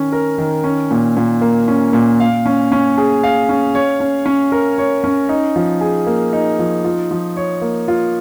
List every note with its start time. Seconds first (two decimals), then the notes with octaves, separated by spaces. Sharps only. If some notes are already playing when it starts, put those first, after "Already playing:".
Already playing: D#3 C#4
0.12 A#4
0.38 D#3
0.64 C#4
0.91 A#2
1.17 A#2
1.41 A#3
1.68 C#4
1.93 A#2
2.20 F5
2.46 C#4
2.72 C#4
2.98 G#4
3.23 F5
3.49 C#4
3.75 C#5
4.00 C#4
4.26 C#4
4.52 A#4
4.78 C#5
5.04 C#4
5.29 D#4
5.56 F3
5.81 G#4
6.07 A#3
6.33 D#4
6.59 F3
6.84 F4
7.11 F3
7.37 C#5
7.62 A#3
7.88 F4